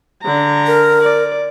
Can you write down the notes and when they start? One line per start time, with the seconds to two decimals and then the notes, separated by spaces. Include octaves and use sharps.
0.22 D3 A#5
0.67 A#4
1.02 D5